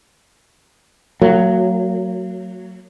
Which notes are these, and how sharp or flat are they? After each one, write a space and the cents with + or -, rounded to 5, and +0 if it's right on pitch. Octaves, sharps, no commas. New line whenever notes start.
F#3 +0 A#3 -40